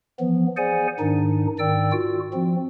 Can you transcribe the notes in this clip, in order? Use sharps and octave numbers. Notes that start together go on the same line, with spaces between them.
E3 F3 B3
G#4 C5 D5 F#5 G#5
G#2 D#3 D4 D#4
G#2 D#3 D5 G5 E6
F4 F#4
F3 C4